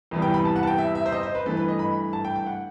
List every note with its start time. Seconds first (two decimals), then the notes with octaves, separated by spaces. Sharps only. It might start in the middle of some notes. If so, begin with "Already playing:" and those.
0.11 E2 C3 E3 G3 B3
0.22 G5
0.34 B5
0.45 A5
0.56 F#5
0.63 A5
0.67 G5
0.78 E5
0.95 E5
1.06 C5
1.12 D#5
1.23 C5
1.35 B4
1.45 G2 E3 A3 A4
1.57 B4
1.68 D#5
1.79 B5
2.13 A5
2.25 G5
2.36 G5
2.46 F#5